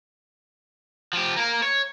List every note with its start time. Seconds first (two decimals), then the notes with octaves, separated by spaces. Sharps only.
1.13 F3 G4
1.36 A#3 A#4
1.63 C#5